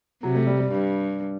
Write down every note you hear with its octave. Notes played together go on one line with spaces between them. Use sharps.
C3 F#3
A3
G3
G3
G2